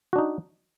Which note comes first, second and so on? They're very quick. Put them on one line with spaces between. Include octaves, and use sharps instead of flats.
F#4 D4 D#4